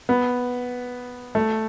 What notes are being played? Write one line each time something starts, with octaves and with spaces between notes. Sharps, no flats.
B3
A3